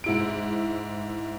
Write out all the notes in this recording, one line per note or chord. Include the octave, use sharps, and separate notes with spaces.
G#2 E4 D7